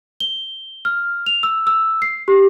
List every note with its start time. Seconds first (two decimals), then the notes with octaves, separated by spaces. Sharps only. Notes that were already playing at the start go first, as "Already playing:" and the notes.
0.20 G7
0.85 F6
1.26 F7
1.43 E6
1.67 E6
2.02 C7
2.28 G4